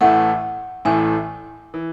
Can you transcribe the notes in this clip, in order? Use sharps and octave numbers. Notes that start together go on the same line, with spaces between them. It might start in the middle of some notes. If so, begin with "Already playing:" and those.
A1 A2 E3 A3 F#5
A1 A2 E3 A3 G#5
E3